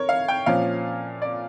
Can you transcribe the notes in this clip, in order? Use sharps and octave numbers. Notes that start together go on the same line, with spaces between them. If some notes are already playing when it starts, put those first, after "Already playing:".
Already playing: A#4 C#5
F5
G5
A#2 F3 C#4 F5
D5